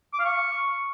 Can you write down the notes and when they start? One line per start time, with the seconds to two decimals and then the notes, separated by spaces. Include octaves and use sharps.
0.13 D6
0.19 F5
0.25 C#6